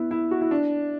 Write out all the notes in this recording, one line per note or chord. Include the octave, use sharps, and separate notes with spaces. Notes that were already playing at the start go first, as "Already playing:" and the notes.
Already playing: B3 E4
E4
F#4
E4
D4